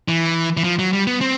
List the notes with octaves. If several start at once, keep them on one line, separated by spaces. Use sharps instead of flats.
E3
E3
F3
F#3
G3
B3
C4